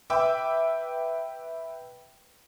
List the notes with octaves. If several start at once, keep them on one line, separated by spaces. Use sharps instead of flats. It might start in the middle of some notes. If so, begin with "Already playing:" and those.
B4 E5 G5 D6 E6